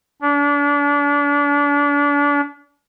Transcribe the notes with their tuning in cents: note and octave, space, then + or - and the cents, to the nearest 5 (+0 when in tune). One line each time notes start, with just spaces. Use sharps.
D4 -35